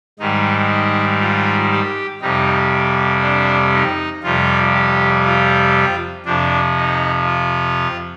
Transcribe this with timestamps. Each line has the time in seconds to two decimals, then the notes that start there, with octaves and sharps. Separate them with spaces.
0.19 G#2 D#3 G3 D#4
0.69 D#4
1.20 F4
1.71 G4
2.21 F2 C3 G3 D#4
3.22 D4
3.73 D#4
4.23 F2 C3 G3 F4
4.74 G4
5.25 F4
6.25 F2 C3 F3 D4
6.76 D#4
7.26 F4